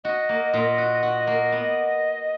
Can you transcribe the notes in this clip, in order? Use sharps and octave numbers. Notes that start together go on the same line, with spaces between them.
F#4 D#5
A#3
A#2
F#4
F#4
A#3
B3